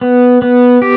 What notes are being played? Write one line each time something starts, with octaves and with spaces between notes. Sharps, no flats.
B3
B3
G4